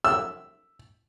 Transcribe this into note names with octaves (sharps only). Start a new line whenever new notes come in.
E6